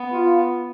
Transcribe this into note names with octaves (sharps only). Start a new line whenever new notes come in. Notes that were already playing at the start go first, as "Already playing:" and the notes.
Already playing: B3
F4